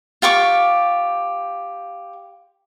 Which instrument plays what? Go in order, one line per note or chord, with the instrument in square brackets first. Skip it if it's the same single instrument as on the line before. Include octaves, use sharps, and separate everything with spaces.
[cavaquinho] F4 G4 C#6 D6